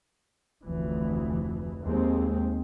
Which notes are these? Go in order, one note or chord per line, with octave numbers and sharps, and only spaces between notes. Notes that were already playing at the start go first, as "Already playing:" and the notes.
F1 D2 E3
D#2 G#3 C4